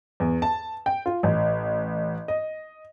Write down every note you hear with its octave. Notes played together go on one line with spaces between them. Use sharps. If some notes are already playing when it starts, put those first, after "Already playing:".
E2
A5
G5
F4
A1
D#5